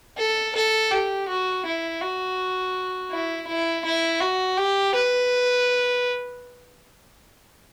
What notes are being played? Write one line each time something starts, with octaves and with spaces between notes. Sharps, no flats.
A4
A4
G4
F#4
E4
F#4
E4
E4
E4
F#4
G4
B4